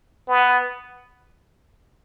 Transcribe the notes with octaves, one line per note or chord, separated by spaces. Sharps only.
B3